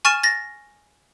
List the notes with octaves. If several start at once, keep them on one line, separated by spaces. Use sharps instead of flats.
G#5 C#6 F6 A6 D#7 E7
A6 A#6